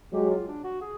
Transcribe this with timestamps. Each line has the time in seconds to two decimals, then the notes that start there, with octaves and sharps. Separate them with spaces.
0.13 F#3 G#3 G4
0.30 F4
0.48 D4
0.64 F#4
0.82 G#4